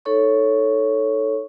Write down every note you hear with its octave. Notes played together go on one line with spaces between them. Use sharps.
D#4 A4 C#5 C#6